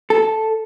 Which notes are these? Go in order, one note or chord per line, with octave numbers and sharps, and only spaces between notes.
A4